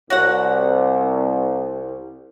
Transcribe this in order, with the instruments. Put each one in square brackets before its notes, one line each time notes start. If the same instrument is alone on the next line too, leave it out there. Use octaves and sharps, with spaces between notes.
[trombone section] C2 [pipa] F#4 C#5 F#5